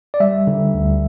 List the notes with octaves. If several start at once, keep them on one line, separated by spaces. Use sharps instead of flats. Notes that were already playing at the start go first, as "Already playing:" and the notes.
D5
G3 E5
D3
D2